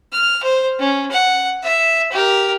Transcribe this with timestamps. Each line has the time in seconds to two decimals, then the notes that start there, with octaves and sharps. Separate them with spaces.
0.13 F6
0.43 C5
0.79 C#4
1.11 F#5
1.63 E5
2.12 G4 A#4